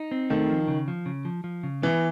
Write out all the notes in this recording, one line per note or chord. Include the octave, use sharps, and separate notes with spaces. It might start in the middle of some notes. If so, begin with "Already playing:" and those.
Already playing: D#4
C4
D#3 A3
F3
C#3
F3
C#3
F3
F3
C#3
E3 B3